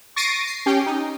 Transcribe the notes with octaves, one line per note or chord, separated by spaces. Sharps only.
C#6 A6 A#6 C7 D7 D#7
C7
C#4 G4 G5
D#4